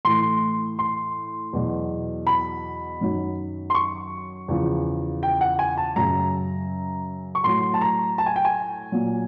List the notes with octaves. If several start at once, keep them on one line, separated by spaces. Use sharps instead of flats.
A2 E3 C6
C6
E2 B2 F#3
B5
F#2 D#3 F#3
C6
C#6
E2 C#3 F3
G5
F#5
G#5
A5
F#2 C#3 F#3 A#5
C#6
A2 F#3 C6
A5
A#5
A5
G#5
G5
G#5
A#2 F#3